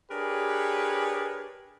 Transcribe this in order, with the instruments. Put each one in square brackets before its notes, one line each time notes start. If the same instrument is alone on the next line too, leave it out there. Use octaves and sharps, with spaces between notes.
[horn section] D4 G4 G#4 A#4 B4 C#5